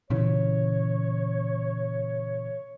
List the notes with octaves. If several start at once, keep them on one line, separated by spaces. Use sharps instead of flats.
A#2 C#3 E3 C#5